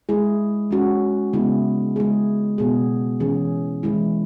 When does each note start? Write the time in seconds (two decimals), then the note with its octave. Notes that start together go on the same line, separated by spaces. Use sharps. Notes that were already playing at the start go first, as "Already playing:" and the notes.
0.09 G#3 E4 G#4
0.71 G#3 C#4 F#4
1.33 C#3 G#3 B3 E4 G#4
1.96 G#3 E4 G#4
2.58 B2 B3 G#4
3.20 E3 C#4 G#4
3.83 E3 G#3 E4